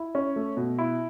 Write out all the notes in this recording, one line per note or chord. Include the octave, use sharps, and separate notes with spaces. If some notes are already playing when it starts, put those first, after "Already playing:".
Already playing: E4
C#4
A3
B2
E4